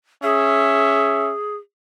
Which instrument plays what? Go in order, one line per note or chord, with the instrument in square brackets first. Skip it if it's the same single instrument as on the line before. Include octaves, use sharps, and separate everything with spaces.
[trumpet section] C#4 E5 [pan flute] G#4